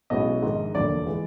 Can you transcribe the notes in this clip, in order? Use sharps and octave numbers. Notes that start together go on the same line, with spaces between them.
B1 B2 G#3 C#4 E4 D#5
A#1 G#2 D#3
E1 D2 D3 F3 A#3 D5
E3 G#3